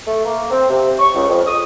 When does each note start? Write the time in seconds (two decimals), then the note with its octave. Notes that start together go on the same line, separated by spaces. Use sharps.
0.07 A3
0.25 A#3
0.51 C4
0.70 C3
0.99 C#6
1.15 C#2
1.28 F2
1.47 D#6